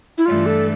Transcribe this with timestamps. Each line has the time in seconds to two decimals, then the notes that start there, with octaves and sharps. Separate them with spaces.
0.18 E4
0.26 G2 E3 A3 D4 F4
0.46 A4